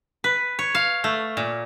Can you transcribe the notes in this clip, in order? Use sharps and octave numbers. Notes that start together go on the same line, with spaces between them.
B4
C#5
F5
A3
A#2